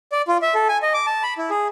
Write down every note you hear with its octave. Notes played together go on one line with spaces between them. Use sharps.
D5
F4
E5
A4
G#5
D#5
D6
A5
B5
E4
G#4